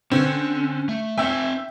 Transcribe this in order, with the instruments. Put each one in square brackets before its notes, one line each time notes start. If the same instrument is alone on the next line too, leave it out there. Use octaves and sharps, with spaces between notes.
[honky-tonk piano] D3 C4 [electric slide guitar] C#4
[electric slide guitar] A3
[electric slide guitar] C4 G#5 [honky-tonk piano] E5 G5 E6